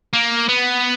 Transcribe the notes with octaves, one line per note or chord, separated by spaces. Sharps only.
A#3
B3